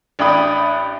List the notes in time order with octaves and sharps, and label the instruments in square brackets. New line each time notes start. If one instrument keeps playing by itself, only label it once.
[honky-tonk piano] A1 D4 G5 B5 D#6